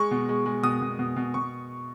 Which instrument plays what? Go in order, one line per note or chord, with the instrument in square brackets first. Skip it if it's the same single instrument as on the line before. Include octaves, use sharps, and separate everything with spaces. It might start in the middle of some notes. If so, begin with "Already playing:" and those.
Already playing: [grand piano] G#3 C#6
B2
G#3
G#3
B2 D#6
B2
B2
B2
B2 C#6